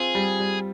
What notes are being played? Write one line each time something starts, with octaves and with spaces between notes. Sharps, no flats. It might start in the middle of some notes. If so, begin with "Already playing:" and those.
Already playing: C4 F4 G#4
G3
G3